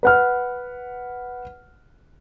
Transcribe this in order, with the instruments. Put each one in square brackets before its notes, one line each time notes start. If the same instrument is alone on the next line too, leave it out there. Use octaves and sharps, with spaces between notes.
[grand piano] B4 F#5 F6